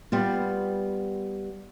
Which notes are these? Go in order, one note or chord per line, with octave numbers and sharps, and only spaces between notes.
G3 B3 F4